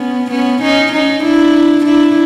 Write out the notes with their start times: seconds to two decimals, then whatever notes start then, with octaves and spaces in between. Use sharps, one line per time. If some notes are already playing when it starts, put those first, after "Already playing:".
Already playing: B3 C#4
0.31 B3 C#4
0.62 C#4 D#4
0.92 C#4 D#4
1.24 D4 E4
1.85 D4 E4